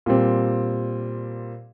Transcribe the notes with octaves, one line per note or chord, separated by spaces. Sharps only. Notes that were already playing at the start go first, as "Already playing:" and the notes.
A#2 G3 C4